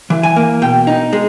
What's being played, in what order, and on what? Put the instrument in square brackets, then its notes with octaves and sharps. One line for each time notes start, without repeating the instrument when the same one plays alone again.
[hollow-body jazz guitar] E3
G#5
A#3
B2 G5
D#4
G#3